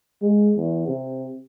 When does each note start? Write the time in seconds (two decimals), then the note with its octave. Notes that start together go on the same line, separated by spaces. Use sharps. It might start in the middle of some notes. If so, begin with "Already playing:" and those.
0.22 G#3
0.56 E2
0.87 C3